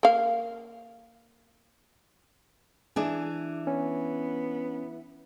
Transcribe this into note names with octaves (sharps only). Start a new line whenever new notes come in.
A#3 F5
E3 D4 G#4
B3 C#4